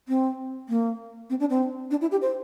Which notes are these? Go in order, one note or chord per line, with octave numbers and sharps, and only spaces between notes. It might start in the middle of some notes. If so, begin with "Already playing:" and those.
C4
A#3
C4
D4
C4
D4
E4
G4
C5